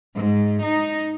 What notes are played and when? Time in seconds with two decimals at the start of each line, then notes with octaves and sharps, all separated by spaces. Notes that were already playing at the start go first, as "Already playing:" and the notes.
0.15 G#2
0.64 D#4